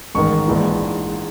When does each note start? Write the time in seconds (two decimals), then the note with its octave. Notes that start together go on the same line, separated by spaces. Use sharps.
0.15 A1 G#2 D#3 C#6
0.48 A#1 G#2 E3